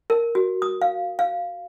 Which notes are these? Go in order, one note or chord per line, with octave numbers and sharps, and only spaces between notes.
A#4
F#4
D#6
F5
F5